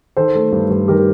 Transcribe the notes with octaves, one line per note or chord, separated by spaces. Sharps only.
D#3 A4 C5
A3
G2
G2
D#3 G4 A#4